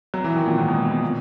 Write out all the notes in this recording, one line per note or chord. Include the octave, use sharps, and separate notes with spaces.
F#3
E3
D#3
A#2
G#2
B2
B2
A#2